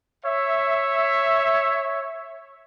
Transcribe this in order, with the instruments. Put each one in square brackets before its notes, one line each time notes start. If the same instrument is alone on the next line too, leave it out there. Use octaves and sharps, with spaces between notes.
[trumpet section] C#5 E5